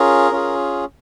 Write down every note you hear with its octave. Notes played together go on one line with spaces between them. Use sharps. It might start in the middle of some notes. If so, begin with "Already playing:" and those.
Already playing: C#4 F4 G#4 A#4
C#4 F4 G#4